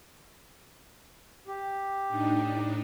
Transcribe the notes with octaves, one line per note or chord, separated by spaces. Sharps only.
G4
A2 D4 D#4